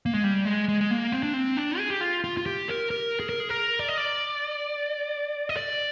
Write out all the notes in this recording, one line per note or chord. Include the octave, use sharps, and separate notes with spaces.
A#3
G#3
G3
G#3
G#3
G#3
A#3
C4
D4
C4
D4
G#4
G4
F4
F4
F4
G4
A#4
A#4
G#4
A#4
G#4
A#4
D5
D#5
D5
D#5
D5